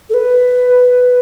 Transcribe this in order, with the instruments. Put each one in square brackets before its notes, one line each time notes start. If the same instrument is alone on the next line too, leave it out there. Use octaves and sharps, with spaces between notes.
[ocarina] A4
B4